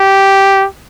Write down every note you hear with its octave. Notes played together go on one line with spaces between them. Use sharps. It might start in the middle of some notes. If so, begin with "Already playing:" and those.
Already playing: G4